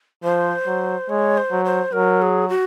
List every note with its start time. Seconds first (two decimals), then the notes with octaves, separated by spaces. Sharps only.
0.24 F3 C5
0.66 F#3
1.09 G#3 C#5
1.37 C5
1.51 F#3
1.65 C5
1.93 F#3 A#4
2.22 G#4
2.49 F#4